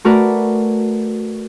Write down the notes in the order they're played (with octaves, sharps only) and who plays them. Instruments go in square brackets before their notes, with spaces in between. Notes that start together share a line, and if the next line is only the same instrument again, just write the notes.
[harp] A3 F#4 A#4 B4 D5